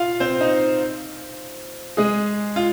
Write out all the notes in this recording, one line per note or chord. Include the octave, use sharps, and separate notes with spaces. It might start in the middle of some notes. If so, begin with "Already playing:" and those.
Already playing: F4 F5
C4 C5
D#4
G#3 G#4
F4